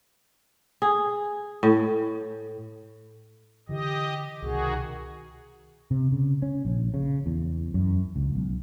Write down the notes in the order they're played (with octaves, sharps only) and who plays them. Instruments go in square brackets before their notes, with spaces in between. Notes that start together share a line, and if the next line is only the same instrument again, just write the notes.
[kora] G#4
A2
[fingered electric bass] D3 E3 [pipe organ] G4 D#5
[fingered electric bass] C2 B2 [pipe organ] D#3 F#4 G#4
[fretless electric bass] C3
C#3
C#4
A#1
C#3
E2
F#2
C#2
B1